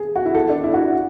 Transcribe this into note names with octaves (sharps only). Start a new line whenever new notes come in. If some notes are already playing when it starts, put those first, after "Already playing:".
Already playing: G#4
F#4
E4
A4
D4
E4
F#4
E4